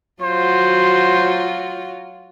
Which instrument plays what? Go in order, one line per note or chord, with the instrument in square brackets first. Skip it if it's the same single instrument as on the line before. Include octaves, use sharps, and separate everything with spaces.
[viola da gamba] F#3 F4 F#4 [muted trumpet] C5